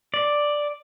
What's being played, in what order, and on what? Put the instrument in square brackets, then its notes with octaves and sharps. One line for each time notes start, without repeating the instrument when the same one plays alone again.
[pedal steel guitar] D5